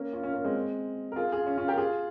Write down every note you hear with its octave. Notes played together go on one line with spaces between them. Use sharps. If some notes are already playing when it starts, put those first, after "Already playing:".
Already playing: A#3 C#4
C#4 F4
C#4 F4
A#3 C#4
G#3 C4
A#4
F4 G#4
F4 G#4
C#4 F4
C#4 F4
G4 A#4
F4 G#4